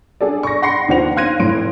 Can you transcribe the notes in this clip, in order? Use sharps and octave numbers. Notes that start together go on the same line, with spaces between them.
D4 G#4 A4 D5
C#6 A#6
F#5 B5 C6 A#6 C7 C#7
D#2 F3 D4 C5 F#5 F7
F5 C6 F#6 G#6 A#6 D#7
F1 A2 C6 D7